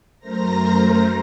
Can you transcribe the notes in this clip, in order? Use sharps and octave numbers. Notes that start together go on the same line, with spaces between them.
F#2 A3 A#4 C5 A#5 A#6